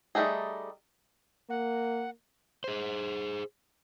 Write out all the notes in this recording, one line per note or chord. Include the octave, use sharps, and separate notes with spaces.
G3 A3 A#3 D#4 G#4
A#3 F#5
G#4 C5